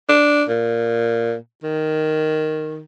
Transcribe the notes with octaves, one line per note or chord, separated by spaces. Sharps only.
D4
A#2
D#3